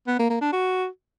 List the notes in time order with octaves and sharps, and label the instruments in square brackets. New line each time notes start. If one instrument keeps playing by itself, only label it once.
[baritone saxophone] B3
A#3
A#3
D4
F#4